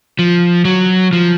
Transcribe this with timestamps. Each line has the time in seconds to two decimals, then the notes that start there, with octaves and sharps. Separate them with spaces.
0.19 F3
0.65 F#3
1.13 F3